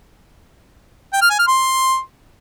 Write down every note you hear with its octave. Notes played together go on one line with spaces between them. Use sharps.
G5
F6
G#5
F6
C6